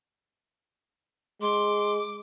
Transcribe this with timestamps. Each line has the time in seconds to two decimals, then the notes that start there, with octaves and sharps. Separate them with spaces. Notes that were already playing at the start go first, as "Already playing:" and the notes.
1.42 G#3 C6 D6